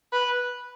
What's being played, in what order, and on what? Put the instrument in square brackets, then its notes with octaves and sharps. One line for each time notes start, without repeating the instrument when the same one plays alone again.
[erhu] B4